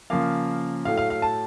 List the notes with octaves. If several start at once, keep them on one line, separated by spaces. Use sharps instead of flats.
C#3 F3 A#3 F5
A2 F#3 A3 F5
F5
F5
A5